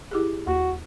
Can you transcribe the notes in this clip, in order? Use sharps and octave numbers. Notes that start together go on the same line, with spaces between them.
E4 G4 G#4
D#2 F#4